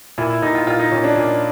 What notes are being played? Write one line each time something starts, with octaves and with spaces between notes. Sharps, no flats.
A#2 E4
E4
A#2 D#4
F4
A#2 F4
D#4
A#2 C#4
D4
A#2